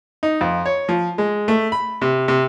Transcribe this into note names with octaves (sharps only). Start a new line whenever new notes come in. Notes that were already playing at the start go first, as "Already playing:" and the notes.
D#4
F2
C#5
F3
G#3
A3
B5
C3
C3